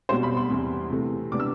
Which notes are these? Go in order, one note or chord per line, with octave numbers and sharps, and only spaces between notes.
B2 G3 C4 C5
B5
C6
E2 C3 G3 C4 E4
C3 E3 A3 C4
C3 G3 B3 D4 D6
E6